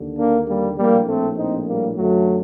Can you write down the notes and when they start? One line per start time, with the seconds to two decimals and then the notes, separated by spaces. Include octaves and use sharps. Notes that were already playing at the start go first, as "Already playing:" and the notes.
Already playing: D#2 D3
0.18 A#3 D4
0.48 G3 A#3
0.78 A#1 A2 G3 A#3
1.07 A3 C4
1.38 C4 D#4
1.67 G3 A#3
1.96 F#2 D3 F#3 A3